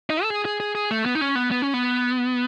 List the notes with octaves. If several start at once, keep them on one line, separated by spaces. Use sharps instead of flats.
D#4
A4
G#4
G#4
G#4
G#4
A3
B3
D#4
C#4
B3
B3
C#4
B3